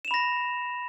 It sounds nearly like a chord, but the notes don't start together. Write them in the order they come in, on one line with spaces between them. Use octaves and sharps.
E7 F7 B5 A#6